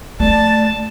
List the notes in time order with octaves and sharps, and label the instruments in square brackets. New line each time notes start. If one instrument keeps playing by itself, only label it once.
[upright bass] A3 [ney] D5 [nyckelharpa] A5